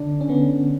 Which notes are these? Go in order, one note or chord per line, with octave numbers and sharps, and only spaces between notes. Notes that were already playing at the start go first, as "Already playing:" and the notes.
Already playing: D3 D4
C#4
D3 B3